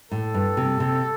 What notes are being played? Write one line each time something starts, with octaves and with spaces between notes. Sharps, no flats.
A2 A4
G2
C3
C3